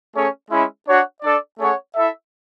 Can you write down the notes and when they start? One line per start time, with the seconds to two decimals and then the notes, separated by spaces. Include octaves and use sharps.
0.14 A3 C#4 G#4 C#5
0.50 G#3 C#4 E4
0.86 D4 F#4 C#5 F#5
1.22 D4 A4 D5
1.58 A3 C#4 G#4 C#5 F#5
1.95 E4 A4 E5